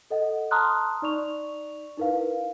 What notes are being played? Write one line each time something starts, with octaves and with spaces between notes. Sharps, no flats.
A4 D#5 F#5
A5 A#5 C6 D#6 F6 F#6
D#4 D5 C#6 F7
D#4 E4 A#4 B4 F5